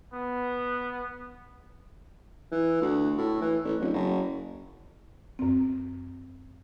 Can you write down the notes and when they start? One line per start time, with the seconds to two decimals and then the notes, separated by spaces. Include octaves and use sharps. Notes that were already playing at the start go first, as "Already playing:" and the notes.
0.14 B3
2.52 E3
2.81 D2
3.18 A2
3.41 E3
3.64 A1
3.80 D1
3.94 F#1
5.39 F#2 C4